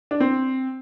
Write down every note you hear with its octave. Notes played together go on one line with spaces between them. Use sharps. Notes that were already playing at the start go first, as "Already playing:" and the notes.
D4
C4